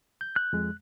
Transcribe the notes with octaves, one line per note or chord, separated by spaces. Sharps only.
G6
F#6
F2 G#3